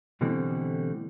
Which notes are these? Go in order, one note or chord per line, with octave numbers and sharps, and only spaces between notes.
B2 D3 E3 G3 A3 C4